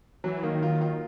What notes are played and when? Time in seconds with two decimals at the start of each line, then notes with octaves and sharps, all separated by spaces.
0.24 E3 F#3
0.43 D#3 A#3
0.63 F4
0.81 F4